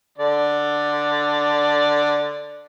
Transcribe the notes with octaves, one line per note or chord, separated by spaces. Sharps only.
D3 D5